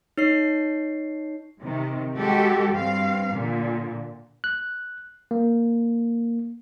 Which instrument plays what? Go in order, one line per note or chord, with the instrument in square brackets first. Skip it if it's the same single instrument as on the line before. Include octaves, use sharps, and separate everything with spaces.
[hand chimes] D#4 C#5 C7
[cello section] C3 D#3
G#3 F#4 G4 A4
G2 C4 F5
A#2 D3
[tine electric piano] F#6
A#3